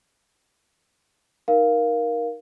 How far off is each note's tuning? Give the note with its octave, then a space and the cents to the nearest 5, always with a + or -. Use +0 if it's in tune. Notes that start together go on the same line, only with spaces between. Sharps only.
D#4 +0 A#4 +15 F5 +0